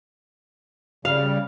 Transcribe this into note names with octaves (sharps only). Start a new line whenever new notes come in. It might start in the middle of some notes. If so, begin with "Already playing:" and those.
C#3 G3 F5